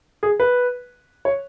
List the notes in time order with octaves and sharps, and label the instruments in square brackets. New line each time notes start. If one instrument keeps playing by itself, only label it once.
[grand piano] G#4
B4
C#5